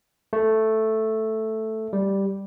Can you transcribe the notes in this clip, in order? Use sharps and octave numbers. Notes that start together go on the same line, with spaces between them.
A3
G3